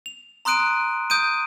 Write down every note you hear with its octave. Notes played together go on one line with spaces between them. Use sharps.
F7
A#5 C6 D#6 F#6 D7 D#7
D#6 G6 D7 D#7